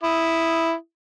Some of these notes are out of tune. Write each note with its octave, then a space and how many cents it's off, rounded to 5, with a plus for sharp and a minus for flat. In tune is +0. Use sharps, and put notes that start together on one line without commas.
E4 +0 D#6 +0